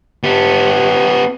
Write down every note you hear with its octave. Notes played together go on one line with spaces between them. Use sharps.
B3 G4